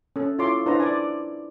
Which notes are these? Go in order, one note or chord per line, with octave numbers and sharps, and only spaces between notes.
C#4 A4
E4 F4 A4 C#5 C6 D6
D4 E4 B4 C5 D5 A#5
D5 G#5